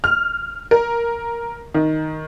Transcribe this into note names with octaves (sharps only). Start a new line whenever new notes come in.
F6
A#4
D#3